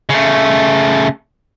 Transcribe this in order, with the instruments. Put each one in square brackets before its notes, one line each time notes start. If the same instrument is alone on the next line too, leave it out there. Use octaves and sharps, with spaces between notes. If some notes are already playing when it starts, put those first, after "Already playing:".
[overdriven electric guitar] C#3 A3